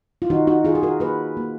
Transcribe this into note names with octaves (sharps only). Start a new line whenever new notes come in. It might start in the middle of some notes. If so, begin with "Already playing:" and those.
F4
D#3 D#4 F#4
D#4 F#4
D#3 F4 G#4
G#4
F#4 A#4
A#3 G#4 B4
A#3